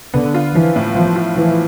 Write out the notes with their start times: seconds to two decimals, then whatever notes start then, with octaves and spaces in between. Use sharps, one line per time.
0.14 D3 B3
0.35 F4
0.54 E3 F3
0.76 A2
0.96 F3 B3
1.16 F4
1.36 E3 F3